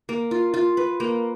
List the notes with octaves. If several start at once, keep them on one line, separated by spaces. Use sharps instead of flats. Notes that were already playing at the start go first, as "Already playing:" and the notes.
A#3
F4
F4
B4
A#3